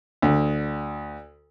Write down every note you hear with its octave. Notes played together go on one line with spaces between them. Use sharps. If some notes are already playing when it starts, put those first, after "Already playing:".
D2